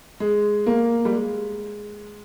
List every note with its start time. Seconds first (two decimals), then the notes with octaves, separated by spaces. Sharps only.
0.20 G#3
0.66 A#3
1.05 G3
1.11 G#3